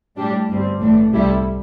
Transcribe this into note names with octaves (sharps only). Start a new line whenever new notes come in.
A2 G3 D4 G4
G1 G2 G3 C4
A1 A2 E3 A3 D4
C2 C3 G3 E4 A4